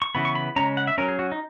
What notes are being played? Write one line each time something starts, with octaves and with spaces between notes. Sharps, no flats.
C#6
C#3 E3 B3 B5
C#6
B5
C#3 G#3 C#4 A#5
F#5
E5
F#3 C#4 A#4
G#4
F#4
D#4